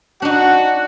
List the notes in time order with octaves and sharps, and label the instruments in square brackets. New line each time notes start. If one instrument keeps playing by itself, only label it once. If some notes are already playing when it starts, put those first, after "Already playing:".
[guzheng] D4 D#4 [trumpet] F#4 [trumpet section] F#5